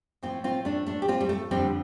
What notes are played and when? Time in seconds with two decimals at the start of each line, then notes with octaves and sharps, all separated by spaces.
0.23 A2 F3 C4 F4
0.44 C4 F4
0.65 A3 D4
0.86 A3 D4
1.02 G4
1.08 C4 F4
1.20 G3
1.29 A3
1.51 F2 D3 F3 G3 C4